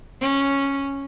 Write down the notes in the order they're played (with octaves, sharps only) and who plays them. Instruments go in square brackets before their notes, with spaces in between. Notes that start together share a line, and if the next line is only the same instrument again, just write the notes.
[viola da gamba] C#4